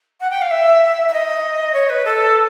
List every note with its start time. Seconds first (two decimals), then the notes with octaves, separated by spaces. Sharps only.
0.21 F#5
0.30 G5
0.41 F5
0.51 E5
1.08 E5
1.13 D#5
1.74 C#5
1.89 B4
2.05 A4